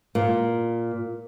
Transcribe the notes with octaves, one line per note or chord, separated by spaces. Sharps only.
A#2